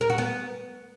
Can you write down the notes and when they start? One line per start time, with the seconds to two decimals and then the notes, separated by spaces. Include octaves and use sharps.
0.01 A#4
0.10 F#4
0.18 B3